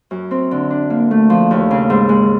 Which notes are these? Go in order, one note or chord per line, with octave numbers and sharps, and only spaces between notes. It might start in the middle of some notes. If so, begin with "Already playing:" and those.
F#2
C4
D3
D4
A#3
A3
F3
D#2
C#3
G#2
G#3